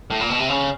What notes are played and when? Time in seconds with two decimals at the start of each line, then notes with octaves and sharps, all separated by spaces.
0.10 A2
0.20 A#2
0.30 B2
0.39 C3
0.49 C#3